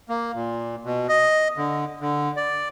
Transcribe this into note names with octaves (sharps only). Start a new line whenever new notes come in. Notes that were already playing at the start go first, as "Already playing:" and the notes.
A#3
A#2
B2
D#5
D3
D3
D5